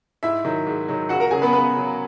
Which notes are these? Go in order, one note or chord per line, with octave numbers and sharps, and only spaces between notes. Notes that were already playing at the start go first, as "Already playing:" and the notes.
G#2 E4 E5
D#3 F#3
G#2
D#3 F#3
C#2 F#4 F#5
A#4 A#5
C#3 F#3 G#4 G#5
B3 B4
C#2 B3 B4
C#3 F#3